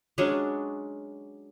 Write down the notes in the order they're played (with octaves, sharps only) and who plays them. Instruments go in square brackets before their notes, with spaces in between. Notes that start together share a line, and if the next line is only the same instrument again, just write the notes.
[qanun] F#3 G#3 C#4 D4